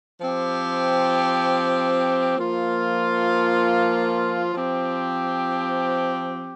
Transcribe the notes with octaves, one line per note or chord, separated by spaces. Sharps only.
F3 C4 G4
F3 A#3 F4
F3 C4 G4